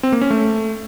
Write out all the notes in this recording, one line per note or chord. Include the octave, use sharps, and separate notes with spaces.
C4
A#3
C#4
A3